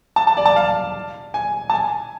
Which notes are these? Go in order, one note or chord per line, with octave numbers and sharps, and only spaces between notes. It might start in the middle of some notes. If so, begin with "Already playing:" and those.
A5
A5
D5
A5
F5
G#5
A5
G#5